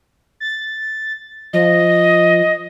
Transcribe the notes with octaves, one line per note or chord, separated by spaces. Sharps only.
A6
F3 D#5